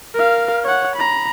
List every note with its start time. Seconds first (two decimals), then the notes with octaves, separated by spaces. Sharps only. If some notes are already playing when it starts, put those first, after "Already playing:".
0.15 A#4 F5
0.64 C#5 F#5
0.96 A#5 B5